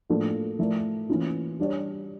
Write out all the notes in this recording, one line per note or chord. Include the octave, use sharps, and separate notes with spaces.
A2 F3 A#3 D4 A4
F3 A3 E4 A#4 D5
E3 A#3 C#4 F4
G3 D4 G4 C#5